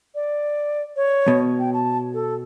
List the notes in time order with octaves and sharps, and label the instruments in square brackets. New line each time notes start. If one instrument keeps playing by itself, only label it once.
[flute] D5
C#5
[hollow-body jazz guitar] B2
[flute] G5
A5
A4